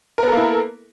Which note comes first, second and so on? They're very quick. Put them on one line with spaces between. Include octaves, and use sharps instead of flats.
A#4 B3 A4 A#3 E4